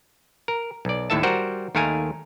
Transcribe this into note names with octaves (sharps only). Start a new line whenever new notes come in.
A#4
B1 D5
D#2 A2 A4 E5 A5
G3 F#4 A#4 C5 F#5
D#2 D#3 A3 A#4 F5 G#5